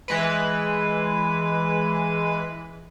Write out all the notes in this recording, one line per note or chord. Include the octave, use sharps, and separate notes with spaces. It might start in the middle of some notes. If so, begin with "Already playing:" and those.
E3 G#3 B4